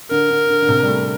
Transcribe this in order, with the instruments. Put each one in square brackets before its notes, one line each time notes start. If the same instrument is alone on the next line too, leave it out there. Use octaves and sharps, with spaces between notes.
[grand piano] D3 [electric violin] A#4
[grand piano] D3
D3
D3
C3
G3
A3